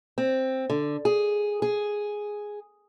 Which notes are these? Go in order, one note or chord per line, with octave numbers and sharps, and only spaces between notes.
C4
D3
G#4
G#4